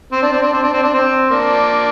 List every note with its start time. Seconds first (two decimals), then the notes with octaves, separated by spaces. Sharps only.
0.12 C4
0.22 D4
0.32 C4
0.43 D4
0.53 C4
0.63 D4
0.74 C4
0.83 D4
0.94 C4
1.30 A#3 D4